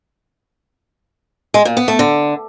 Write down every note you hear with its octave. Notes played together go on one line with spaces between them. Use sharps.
G#3
A#2
B3
A3
D3